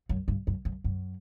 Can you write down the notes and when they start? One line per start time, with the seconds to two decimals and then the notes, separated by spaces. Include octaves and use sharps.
0.09 F#2
0.28 G2
0.47 F#2
0.65 F#2
0.84 F#2